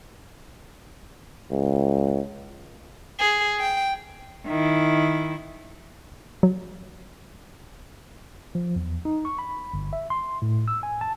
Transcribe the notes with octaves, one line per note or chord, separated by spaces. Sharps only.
C#2
G#4
G5
D#3 E4
F#3
F3
E2
D#4
C#6
B5
G1
E5
C6
A2
E6
G#5
A5